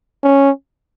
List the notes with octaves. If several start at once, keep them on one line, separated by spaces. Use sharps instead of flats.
C#4